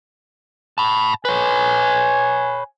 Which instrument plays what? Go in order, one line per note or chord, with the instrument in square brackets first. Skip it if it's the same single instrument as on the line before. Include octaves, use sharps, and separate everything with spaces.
[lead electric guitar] A5 B5
[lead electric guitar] B4 C#5 [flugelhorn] G#5